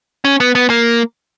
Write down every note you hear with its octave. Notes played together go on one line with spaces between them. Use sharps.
C#4
B3
B3
A#3